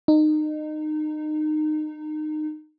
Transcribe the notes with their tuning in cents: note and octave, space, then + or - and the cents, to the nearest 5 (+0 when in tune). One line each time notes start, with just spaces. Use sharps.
D#4 -25